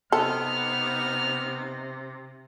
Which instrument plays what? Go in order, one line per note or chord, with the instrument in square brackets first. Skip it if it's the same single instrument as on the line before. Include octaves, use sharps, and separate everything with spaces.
[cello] C3 [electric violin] B3 D#4 [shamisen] A4 [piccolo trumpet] F6